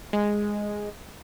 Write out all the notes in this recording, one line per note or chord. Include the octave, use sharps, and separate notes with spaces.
G#3